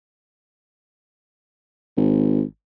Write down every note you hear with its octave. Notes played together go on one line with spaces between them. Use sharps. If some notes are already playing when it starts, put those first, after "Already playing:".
G#1